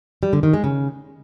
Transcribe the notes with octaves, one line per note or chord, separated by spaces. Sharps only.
G3
D3
D#3
G#3
C#3